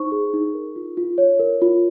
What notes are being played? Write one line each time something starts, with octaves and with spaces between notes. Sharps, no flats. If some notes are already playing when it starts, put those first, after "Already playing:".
Already playing: D#4 C5 C#6
G#4
D#4
A#4
F4
F4
C#5
A#4
F4